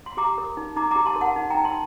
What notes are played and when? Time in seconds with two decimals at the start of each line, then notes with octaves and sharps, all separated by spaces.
0.06 C6
0.17 G4 A#5 D6
0.38 A#4
0.57 D#4
0.76 D#4 A#5 D6
0.91 G4 A#5 D6
1.06 A5 C6
1.16 A#4
1.21 F#5 A5
1.36 D#4
1.50 D#4 G5 A#5
1.65 A5 C6